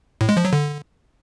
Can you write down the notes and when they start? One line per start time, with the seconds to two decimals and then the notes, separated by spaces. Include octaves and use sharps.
0.21 A2
0.29 G#3
0.37 F3
0.45 F#3
0.53 D3